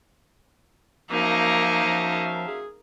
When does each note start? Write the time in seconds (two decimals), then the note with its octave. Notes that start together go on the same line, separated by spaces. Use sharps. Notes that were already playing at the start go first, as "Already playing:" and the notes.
1.11 F#2 F3 A#3 D#4 E5 F5
1.85 F3
2.48 G#4